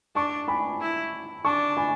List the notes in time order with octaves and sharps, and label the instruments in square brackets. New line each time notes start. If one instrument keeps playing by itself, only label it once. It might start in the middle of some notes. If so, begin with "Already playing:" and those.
[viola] D4 [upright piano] A5 C#6
[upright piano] G#5 B5
[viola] E4
[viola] D4 [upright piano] A5 C#6
[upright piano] G#5 B5